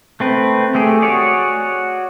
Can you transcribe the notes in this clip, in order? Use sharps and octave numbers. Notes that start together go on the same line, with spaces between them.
A3 C4 B4
A3 G4 G#4
F#4 G#4 C#5 D5